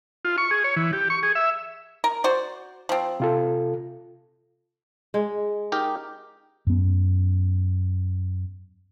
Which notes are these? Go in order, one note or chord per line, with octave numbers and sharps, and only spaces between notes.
F4
C#6
G#4
C#5
E3
G4
C#6
G#4
E5
A#4
F#4 C5 D5
F3 C4
C3 F4 A4
G#3
D#4 G4 A#4
F#2 B3